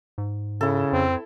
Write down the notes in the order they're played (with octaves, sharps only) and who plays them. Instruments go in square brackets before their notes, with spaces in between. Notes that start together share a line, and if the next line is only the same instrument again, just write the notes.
[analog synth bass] G#2
[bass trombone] C#3 [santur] E4 A4
[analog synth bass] F2 [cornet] C4